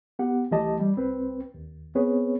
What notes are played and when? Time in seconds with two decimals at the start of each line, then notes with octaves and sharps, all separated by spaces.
0.19 B3 G4 F#5
0.51 C2 E3 A3 G4 D#5 A5
0.80 G3
0.96 C2 C4 B4
1.54 D#2
1.95 B3 C4 G#4 B4 C#5